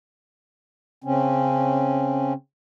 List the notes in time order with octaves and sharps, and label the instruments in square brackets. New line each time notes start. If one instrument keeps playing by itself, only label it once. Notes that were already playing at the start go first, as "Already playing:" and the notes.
[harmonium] C#3 C4 C#4